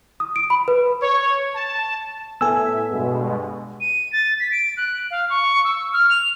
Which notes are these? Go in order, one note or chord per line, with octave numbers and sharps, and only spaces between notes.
D#6
D7
B5
B4
C#5
A5
A2 B3 A4 E5 G#5 E6
G2 B2 G#3
D#7
A6
B6
D7
F#6
F5
C#6
E6
F6
F7